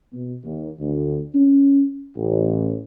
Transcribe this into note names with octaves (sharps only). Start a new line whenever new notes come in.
B2
D#2
D2
C#4
A1